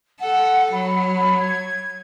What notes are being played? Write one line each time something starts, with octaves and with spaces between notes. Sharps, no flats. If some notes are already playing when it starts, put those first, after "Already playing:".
A4 F#5
F#3 B5
G#6